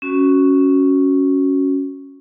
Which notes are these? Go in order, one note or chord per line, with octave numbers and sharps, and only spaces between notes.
C#4 F#4